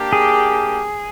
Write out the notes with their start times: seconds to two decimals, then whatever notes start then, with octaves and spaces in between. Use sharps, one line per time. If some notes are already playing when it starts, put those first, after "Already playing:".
Already playing: A#3 D4 G4
0.13 G#4